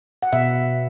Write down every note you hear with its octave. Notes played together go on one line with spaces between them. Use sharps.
F#5
B2 E5